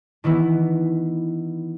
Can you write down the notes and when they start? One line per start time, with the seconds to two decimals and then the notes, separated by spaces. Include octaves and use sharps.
0.24 D#3 E3 B3 E4